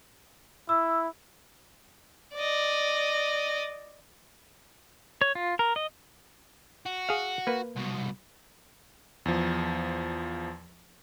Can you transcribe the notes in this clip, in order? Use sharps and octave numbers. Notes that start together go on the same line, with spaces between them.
E4 E6
D5 D#5
C#5
F4
A#4
D#5
F#4
G#4 F5
A#3 B4
C2 B2
E2 F3